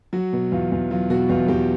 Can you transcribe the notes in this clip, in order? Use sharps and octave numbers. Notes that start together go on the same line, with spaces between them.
F#3 F#4
B2
E2 F4
E2
F#3 F4
B2 F#4
E2 F4
E2 G4